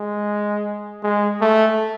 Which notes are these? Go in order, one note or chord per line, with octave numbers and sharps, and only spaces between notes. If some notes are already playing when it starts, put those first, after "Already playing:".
Already playing: G#3
G#3
A3